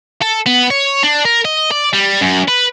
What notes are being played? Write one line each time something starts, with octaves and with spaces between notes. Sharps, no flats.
A4
B3
C#5
D4
A#4
D#5
D5
G3
F#2
B4